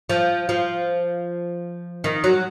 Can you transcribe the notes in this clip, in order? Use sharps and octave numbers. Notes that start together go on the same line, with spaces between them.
F3
F3
D#3
F#3